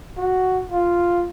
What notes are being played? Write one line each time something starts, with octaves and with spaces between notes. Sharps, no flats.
F#4
F4